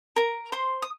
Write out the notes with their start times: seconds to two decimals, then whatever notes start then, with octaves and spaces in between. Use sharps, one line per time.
0.16 A#4 A#5
0.52 C5 C6
0.82 D#6